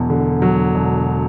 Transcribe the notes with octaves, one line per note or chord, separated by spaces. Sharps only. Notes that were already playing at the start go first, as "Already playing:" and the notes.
Already playing: E1 E2 F#3
D3
F#3
E1